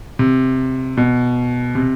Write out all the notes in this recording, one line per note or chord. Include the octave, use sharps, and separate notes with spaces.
C3
B2
C3